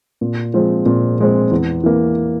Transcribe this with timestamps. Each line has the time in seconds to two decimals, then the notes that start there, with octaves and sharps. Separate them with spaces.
0.21 A#2
0.54 F3 G#3 C4
0.86 A#2
1.19 F3 G#3 C4
1.51 E2
1.84 E3 A#3